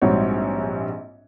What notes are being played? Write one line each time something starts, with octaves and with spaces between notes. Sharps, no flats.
A#1 G#2 G3 C4 F#4 C#5